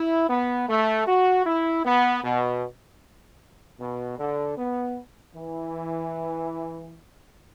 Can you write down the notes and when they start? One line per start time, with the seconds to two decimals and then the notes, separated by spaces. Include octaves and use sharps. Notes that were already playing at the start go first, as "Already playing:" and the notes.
Already playing: E4
0.30 B3
0.69 A3
1.07 F#4
1.46 E4
1.86 B3
2.24 B2
3.80 B2
4.19 D3
4.58 B3
5.35 E3